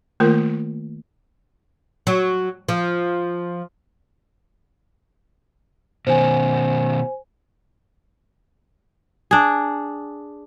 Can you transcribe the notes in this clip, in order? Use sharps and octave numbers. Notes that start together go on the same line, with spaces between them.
D#3 A3 A#3 F4 A#4
F#3
F3
B2 D#3 C5 G#5
D4 G#4